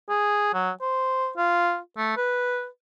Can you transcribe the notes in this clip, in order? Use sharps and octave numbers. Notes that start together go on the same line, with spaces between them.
G#4
F#3
C5
F4
A3
B4